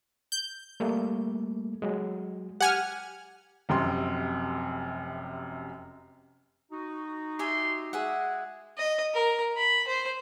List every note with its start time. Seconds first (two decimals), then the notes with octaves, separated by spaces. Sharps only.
0.32 G6
0.80 G3 A3 A#3
1.82 F#3 G#3
2.60 G4 F#5 G#5 F6
3.69 F1 F#2 C3 G5 C6
6.71 D#4 F#4
7.39 G4 E5 G#5 C6
7.93 G#3 G#4 E5 F#5
8.77 D#5
9.14 A#4
9.57 B5
9.87 C5